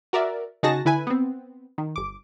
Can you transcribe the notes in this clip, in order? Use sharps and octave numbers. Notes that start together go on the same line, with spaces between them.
F#4 A#4 D5 E5
C#3 D#4 F#4 G#4 A5 A#6
D3 E4 B4 G#5
B3 C4
D#3
G1 D6